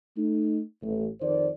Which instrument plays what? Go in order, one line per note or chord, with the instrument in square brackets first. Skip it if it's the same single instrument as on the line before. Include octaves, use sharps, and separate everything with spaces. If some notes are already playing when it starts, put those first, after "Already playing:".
[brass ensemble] A3 D#4
A1
F2 D#3 C5 D5